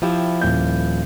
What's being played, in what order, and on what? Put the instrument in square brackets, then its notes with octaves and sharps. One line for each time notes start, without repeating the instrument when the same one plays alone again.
[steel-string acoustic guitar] F3 E4 G4
[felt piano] D#1 G6